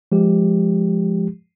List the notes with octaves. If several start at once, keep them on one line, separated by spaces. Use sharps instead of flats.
F3 G#3 G4